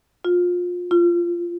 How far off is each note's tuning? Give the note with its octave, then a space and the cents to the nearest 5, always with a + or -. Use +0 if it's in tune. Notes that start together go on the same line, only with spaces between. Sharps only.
F4 +25
F4 -15